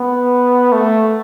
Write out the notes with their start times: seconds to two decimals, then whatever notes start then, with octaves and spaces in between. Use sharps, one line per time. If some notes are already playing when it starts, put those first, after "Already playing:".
Already playing: B3
0.73 A3